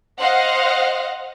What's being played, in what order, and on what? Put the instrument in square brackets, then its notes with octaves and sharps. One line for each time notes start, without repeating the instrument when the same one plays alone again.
[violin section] C5 D#5 F5 F#5